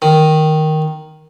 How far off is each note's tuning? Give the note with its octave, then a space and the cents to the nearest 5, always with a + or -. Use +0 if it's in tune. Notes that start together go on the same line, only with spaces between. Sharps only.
D#3 +0